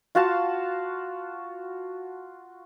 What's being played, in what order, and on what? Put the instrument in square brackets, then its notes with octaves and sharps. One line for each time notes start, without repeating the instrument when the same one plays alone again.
[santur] F4 F#4 F5 A5